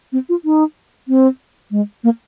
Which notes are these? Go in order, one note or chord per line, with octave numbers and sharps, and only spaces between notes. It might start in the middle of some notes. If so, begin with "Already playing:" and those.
C4
F4
D#4
C4
G#3
A#3